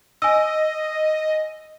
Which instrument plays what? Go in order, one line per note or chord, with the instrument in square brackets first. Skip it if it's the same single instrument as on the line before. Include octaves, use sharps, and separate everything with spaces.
[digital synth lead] D#5 [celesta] G#5 E6